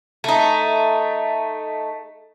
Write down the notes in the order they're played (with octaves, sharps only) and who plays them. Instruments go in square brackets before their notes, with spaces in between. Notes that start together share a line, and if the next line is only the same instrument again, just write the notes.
[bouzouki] A3 D#4